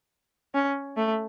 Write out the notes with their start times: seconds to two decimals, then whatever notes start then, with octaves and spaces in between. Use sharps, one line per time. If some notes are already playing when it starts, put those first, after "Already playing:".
0.54 C#4
0.97 A3